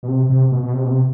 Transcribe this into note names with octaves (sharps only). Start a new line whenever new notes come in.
B2
C3
C3
B2
B2
C3
B2
C3